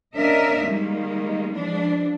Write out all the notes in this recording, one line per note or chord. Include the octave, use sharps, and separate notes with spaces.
A#3 C#4 D4 A#4 D#5 E5
D#3 G3 G#3 A#3
E3 F3 G#3 D4